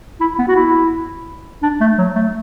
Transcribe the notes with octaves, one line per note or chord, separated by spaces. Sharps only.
E4
B3
F#4
E4
D4
A3
F#3
A3